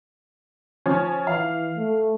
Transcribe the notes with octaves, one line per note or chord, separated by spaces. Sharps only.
F3 C#4
E3 F5
A3